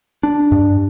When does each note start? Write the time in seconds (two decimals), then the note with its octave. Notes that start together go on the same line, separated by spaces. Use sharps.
0.23 D4
0.52 G2